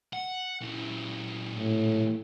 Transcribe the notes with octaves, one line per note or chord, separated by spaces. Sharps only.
F#5
A#2 E3
A2